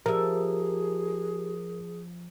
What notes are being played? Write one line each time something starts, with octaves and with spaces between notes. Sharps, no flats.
F3 G4 G#4 A#4 E5